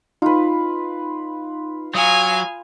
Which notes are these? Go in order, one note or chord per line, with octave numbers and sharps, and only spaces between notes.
D#4 F4 B4
F#3 F5 G#5 D#6